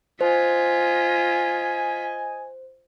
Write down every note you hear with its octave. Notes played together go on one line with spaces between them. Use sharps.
F4 C5 D#5 G#5 B6